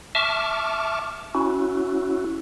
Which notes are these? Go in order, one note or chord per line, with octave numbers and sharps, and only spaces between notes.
E5 A5 C#6 D6 F6
C#4 E4 F#4